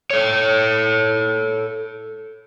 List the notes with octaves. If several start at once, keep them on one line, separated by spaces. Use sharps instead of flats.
A4 C#5